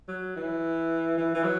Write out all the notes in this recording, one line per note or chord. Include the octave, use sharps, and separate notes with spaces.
F#3
E3
E3
E3
F#3